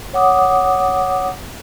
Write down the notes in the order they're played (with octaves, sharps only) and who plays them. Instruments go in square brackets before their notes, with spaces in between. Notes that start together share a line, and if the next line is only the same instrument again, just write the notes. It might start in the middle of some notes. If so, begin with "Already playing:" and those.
[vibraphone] C#5 F#5 D6 D#6